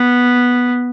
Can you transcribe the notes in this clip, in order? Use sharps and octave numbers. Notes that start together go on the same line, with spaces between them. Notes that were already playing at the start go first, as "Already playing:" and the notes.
Already playing: B3